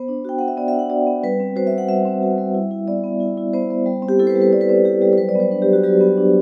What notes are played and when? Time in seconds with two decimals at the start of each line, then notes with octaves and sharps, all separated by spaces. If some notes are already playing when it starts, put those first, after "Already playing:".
Already playing: B3 C5
0.08 D4
0.25 F#4 G5
0.39 B3 F#5
0.48 E5
0.57 B3 D5
0.68 E5
0.73 D4
0.79 F#5
0.90 F#4 D5
1.07 B3
1.23 G3 B4
1.40 C4
1.56 F#4 C5
1.67 E5
1.72 G3
1.78 F#5
1.89 G3 E5
2.05 C4
2.22 F#4
2.38 G3
2.55 E4
2.71 E4
2.88 B3 D5
3.04 B3
3.20 E4
3.38 E4
3.53 B3 C5
3.70 B3
3.86 G3
4.02 C4
4.09 G4
4.19 E4 A4
4.27 C5
4.30 B4
4.35 G3
4.42 B4
4.52 G3 D5
4.61 B4
4.69 C4 C5
4.85 E4 G4
5.02 G3 G4
5.13 C5
5.18 F#3 B4
5.29 D5
5.35 B3
5.40 C5
5.51 D4 B4
5.62 G4
5.68 F#3 F#4
5.84 F#3 G4
6.01 B3
6.17 D4